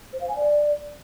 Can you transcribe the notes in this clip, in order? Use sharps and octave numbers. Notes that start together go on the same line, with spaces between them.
C5
F5
G#5
D5